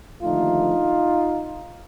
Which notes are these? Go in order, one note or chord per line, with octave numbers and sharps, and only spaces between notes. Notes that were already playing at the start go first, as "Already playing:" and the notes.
D#2 D3 F3 A3 D#4 F4